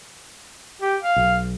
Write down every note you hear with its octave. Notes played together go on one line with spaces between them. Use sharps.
G4
F5
B1